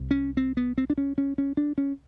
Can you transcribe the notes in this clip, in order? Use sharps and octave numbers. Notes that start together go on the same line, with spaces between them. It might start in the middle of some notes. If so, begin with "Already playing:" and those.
Already playing: C2 C3
C#4
C4
B3
C4
D4
C#4
C#4
C#4
D4
C#4